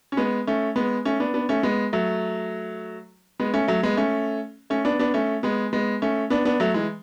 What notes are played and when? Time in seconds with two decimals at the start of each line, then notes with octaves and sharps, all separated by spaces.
0.12 C#4
0.17 G#3 B3
0.47 A3 C#4
0.76 G#3 B3
1.05 A3 C#4
1.20 B3 D4
1.34 B3 D4
1.49 A3 C#4
1.63 G#3 B3
1.93 F#3 A3
3.40 G#3 B3
3.54 A3 C#4
3.68 F#3 A3
3.83 G#3 B3
3.97 A3 C#4
4.70 A3 C#4
4.85 B3 D4
4.99 B3 D4
5.14 A3 C#4
5.43 G#3 B3
5.73 G#3 B3
6.02 A3 C#4
6.30 B3 D4
6.45 B3 D4
6.60 F#3 A3
6.74 E3 G#3